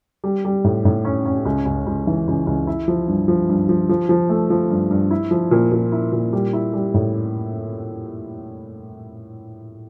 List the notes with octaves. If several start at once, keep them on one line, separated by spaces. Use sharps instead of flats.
G3
G3
A2
A2
C#4
C#4
C#2
C#2
C#2
E3
C#2
C#2
E4
F3
G2
F3
G2
F3
F3
F3
A3
F3
G2
G2
E4
F3
A#2
A#2
E4
A#2
G3
E4
G3
A2